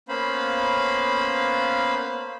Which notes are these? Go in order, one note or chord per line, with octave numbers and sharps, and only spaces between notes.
A#3 B3 C#4 C5 F5 B5